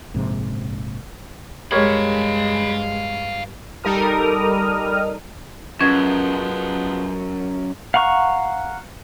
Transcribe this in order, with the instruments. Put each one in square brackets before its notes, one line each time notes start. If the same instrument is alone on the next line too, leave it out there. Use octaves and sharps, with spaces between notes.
[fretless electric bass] A#1 G#2 C3
[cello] G2 [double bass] G#3 [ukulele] G4 A#4 C#5 [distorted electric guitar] F5 B5
[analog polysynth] G3 D#4 A4 A#4 D#6 F6
[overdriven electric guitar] F#2 [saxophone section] F3 G#3 B3 [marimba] C#4 G#6
[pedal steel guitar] F5 F#5 A#5 C#6